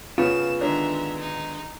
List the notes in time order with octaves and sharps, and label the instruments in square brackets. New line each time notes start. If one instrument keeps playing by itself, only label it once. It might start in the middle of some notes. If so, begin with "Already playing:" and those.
[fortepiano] C#3 [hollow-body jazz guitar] B3 F4 [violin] E7
[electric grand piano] D3 D#3 G#3 [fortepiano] D4 [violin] E5 A#5
[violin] D#4